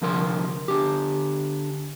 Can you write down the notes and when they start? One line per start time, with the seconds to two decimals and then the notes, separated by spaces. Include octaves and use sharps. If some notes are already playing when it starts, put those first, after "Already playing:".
0.01 C2 D3 F3 A#4 C6
0.68 D3 G4